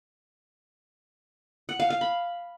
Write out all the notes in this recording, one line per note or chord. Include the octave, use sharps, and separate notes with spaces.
F#5
F5
F5
B5